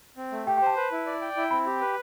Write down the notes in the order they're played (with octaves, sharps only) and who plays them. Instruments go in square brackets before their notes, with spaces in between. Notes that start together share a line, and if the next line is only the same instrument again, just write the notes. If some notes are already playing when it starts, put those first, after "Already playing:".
[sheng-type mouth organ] C4
A3
[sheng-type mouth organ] G4 [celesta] G5
[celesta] G5
[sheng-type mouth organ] C5 [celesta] A5
[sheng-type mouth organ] B4
E4
D5
G5
E4
[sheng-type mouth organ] C4 [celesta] B5
[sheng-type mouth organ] G4
B4